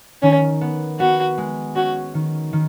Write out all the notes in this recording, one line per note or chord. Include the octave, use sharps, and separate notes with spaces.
D#3 C#4
B3
B3 F#4
G#3
C#4 F#4
D#3
D#3